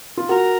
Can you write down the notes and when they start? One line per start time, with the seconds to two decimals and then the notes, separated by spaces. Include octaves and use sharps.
0.18 F4
0.29 F#4 A#4